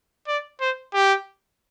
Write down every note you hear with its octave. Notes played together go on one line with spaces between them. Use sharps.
D5
C5
G4